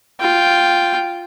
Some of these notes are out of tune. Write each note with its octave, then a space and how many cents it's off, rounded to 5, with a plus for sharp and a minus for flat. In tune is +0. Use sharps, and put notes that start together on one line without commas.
F4 +0 G5 +0